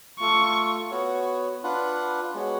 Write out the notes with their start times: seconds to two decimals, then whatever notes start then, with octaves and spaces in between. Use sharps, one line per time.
0.20 A3 F4 A4 C#6
0.91 B3 F#4 C#5
1.63 D4 F4 B4 F#5
2.34 G#3 B3 F#4 C#5 F#5